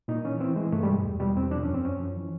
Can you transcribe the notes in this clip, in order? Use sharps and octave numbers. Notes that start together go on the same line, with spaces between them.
A#2 D#4
E3 C#4
E3 C4
E3 G#3
G2 A3
G3
B2 G#3
E2
B2 G3
E2 C4
F3 D4
F#2 C#4
C4
F#2 C#4
F3
E3